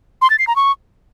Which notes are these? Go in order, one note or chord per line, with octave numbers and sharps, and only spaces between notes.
C6
A6
C7
A#5
C#6